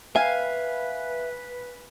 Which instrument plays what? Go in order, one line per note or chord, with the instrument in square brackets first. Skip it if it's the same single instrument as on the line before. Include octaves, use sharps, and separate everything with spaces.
[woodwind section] B4 [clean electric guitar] E5 [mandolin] F5 [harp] G#5